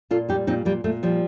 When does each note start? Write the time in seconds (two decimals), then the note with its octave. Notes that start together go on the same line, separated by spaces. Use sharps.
0.11 A#2 F4 A4
0.29 G3 D#4 G4
0.47 A#2 C4 D#4
0.65 A#2 G3 A#3
0.84 A#2 A3
1.03 F3 G3